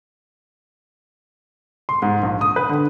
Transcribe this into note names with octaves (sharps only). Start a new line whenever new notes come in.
C6
G#2
A#1
D#6
B4
D3